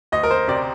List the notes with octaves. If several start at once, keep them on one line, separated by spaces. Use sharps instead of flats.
D2 D#5
A#4
C5
C3 D5